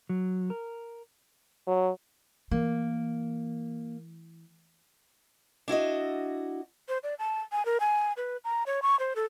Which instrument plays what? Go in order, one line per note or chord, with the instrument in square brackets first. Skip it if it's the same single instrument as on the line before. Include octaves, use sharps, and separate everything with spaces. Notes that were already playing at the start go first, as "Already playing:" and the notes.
[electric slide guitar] F#3
A#4
[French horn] F#3
[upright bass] E3 [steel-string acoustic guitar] A#3
[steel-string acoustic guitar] D4 E4 F#4 D#5
[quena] C5
D5
A5
G#5
A#4
G#5
B4
A#5
C#5
C#6
C5
A4